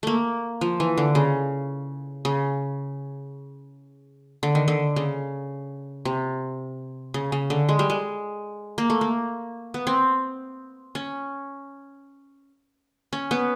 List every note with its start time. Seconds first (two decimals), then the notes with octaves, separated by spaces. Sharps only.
0.03 A3 A#3
0.61 F3
0.80 E3
0.98 D3
1.15 C#3
2.25 C#3
4.43 D3
4.55 D#3
4.68 D3
4.96 C#3
6.05 C3
7.14 C#3
7.32 C#3
7.50 D3
7.69 G#3
7.79 G3
7.90 G#3
8.78 A#3
8.90 A3
9.01 A#3
9.74 B3
9.87 C4
10.95 C#4
13.13 C#4
13.31 B3